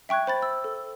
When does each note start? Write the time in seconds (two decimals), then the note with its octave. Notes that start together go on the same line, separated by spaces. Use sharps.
0.09 E5 G5 C#6 F#6 G#6
0.27 C5 B5 A6
0.42 E6
0.64 A4